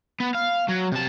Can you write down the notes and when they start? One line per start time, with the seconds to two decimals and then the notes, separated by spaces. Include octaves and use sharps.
0.20 B3
0.35 F5
0.68 F#3
0.92 C3 A5